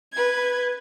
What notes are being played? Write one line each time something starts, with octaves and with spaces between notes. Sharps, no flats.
B4 G#6